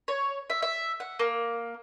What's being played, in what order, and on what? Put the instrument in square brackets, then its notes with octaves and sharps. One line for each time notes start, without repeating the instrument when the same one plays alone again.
[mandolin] C#5
E5
E5
F#5
A#3